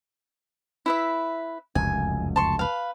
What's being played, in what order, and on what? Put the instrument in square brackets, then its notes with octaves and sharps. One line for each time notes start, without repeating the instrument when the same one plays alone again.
[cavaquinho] E4 B4 E5
[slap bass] F1 C#2 F#2 [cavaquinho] G#5
[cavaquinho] A5 C6 C#6
B4 F5